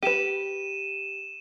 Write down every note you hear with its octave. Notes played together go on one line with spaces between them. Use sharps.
G4 B4 D#7 E7